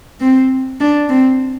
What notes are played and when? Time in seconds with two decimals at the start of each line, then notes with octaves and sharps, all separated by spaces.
0.21 C4
0.80 D4
1.10 C4